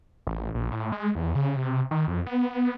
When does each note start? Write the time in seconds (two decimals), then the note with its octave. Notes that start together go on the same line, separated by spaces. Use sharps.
0.27 A1
0.54 A#1
0.72 A2
0.92 G#3
1.15 E2
1.35 C#3
1.56 C3
1.91 D#3
2.07 F2
2.26 B3